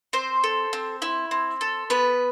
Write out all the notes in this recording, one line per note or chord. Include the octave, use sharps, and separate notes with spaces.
C4 C5
A4
C4
E4
C4
A4
B3 B4